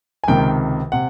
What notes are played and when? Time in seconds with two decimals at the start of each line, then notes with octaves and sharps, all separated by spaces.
0.24 G#5
0.28 C#2 C3 D#3 G5
0.92 C3 F#5